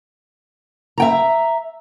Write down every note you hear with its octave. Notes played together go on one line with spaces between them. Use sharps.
E5 G5 A#5